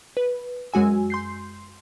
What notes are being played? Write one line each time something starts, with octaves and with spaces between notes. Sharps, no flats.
B4
F#2 G#3 F#4 G#5 E6
C6 G6 C7